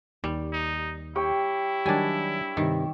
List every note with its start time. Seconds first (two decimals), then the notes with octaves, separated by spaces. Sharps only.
0.24 D#2 G3
0.52 D#4
1.16 E4 G4 C#5 G5
1.86 D#3 F#3 G3 D4 G#5
2.57 G2 C3 D#3